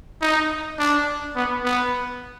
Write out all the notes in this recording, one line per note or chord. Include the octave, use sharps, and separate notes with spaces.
D#4
D4
B3
B3